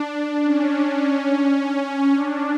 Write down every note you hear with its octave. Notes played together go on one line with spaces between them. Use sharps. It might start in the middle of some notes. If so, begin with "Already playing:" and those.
Already playing: D4
C#4
C#4
D4